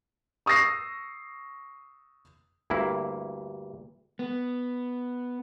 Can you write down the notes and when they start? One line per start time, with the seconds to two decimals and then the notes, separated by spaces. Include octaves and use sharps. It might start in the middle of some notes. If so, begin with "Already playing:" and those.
0.46 C#6 D#6 E6 A#6 C7
2.70 D2 G2 A#3 E4
4.19 B3